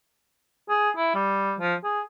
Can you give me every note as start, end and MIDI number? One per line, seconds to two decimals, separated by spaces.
0.69 0.90 68
0.97 1.13 64
1.14 1.54 55
1.59 1.74 53
1.83 2.01 68